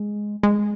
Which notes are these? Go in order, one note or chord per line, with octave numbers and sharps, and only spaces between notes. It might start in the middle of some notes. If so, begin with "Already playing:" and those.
Already playing: G#3
G#3